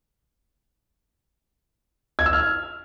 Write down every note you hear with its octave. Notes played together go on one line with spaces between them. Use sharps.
G#6
E6
F6